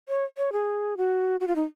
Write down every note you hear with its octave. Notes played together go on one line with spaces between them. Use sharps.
C#5
C#5
G#4
F#4
F#4
F4
D#4